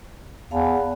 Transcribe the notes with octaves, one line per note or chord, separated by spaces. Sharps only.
E2 F5 A5 B5